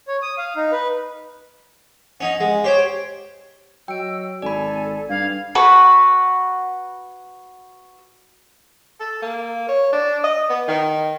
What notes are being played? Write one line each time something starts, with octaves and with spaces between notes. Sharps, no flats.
C#5
D#6
F5
D#4
B4
C#4 D#4 F#5
G#3 F#5
G4 C5 C#5 G5
F#3 D#5 G5 E6 D7
G#1 A4 D5 G#5 B5
G2 F5 G#6
F#4 B4
A4
A#3
C#5
D4
D#5
B3
D#3